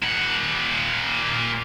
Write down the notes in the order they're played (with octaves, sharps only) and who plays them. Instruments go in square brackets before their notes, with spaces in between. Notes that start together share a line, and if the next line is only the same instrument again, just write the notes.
[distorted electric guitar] A#2 F#5